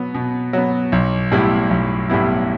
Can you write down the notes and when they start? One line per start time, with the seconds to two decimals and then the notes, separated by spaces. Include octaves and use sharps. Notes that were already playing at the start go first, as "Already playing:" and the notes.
Already playing: B2 F#3 B3
0.14 B2
0.53 F#3 B3
0.92 B1
1.32 A2 G3 B3 E4
1.70 B1
2.10 A2 G3 B3 E4